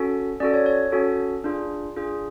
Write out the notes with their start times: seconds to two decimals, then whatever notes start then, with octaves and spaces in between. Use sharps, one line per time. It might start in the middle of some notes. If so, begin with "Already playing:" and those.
Already playing: C#4 F#4 A4
0.40 C#4 F#4 A4 D5
0.54 C#5
0.66 C#5
0.92 C#4 F#4 A4
1.44 D4 F4 G#4
1.96 D4 F4 G#4